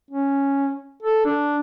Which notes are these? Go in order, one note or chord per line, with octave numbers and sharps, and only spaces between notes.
C#4
A4
D4